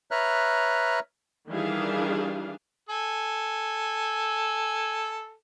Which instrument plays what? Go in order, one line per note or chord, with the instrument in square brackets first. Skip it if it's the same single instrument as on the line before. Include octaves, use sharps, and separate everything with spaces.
[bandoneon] B4 C#5 E5 A#5 F6 F#6
[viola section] D#3 E3 G3 D4 G#4 F5
[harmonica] A4 G#5